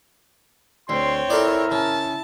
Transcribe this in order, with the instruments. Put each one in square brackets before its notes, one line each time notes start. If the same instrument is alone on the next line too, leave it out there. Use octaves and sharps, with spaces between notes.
[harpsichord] D2 [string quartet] C4 C#5 [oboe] C6
[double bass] E4 [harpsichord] F4 A4 D5 [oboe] A#4
[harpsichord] C#3 [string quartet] A5